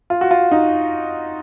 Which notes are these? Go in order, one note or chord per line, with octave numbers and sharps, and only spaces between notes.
F4
F#4
F4
D#4